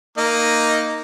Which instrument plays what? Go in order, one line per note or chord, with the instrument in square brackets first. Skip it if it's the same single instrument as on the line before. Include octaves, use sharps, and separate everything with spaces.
[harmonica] A#3 D#4 D#5